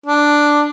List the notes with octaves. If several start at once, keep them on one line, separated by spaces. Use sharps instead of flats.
D4